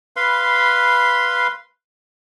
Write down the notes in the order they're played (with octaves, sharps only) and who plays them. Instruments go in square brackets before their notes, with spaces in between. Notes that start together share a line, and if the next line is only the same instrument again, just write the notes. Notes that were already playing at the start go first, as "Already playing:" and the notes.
[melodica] B4 F5 B5 C6